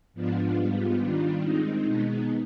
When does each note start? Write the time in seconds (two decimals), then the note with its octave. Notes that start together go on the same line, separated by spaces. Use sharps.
0.14 G#2 F3 B3 D4 F4
0.56 G#2 G3 B3 F4
0.99 D#3 G3 D4 F4
1.42 D#3 G#3 C4 D#4
1.84 B2 G#3 B3 D#4